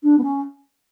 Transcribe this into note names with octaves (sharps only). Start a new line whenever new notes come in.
D4
B3
C#4